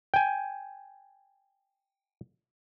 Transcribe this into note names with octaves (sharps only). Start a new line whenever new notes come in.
G5 G#5